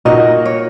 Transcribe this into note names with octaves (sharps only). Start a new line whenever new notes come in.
A#2 A#3 D#4 F#4 A#4 D#5
C#5